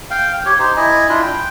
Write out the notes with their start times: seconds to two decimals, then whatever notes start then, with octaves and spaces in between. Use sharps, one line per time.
0.11 F5 G5
0.46 G4 C#5
0.59 D#4 G4 C5
0.77 E4 D#5 G#5
1.09 D4 E4 F4
1.23 G5